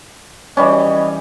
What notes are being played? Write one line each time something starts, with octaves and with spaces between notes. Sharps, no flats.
E3 G3 C#4 D#5